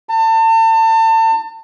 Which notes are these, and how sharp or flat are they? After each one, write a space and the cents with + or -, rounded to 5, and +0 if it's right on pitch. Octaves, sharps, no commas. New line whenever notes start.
A5 +35